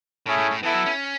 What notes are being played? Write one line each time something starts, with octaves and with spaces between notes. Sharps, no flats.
A2 A3 C#4 E4 G#4
A2
A2
E3 B3 E4 A4 E5
F#3
C#4